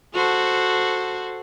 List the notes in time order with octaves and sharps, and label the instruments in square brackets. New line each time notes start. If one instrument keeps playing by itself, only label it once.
[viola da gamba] F#4 A4 C5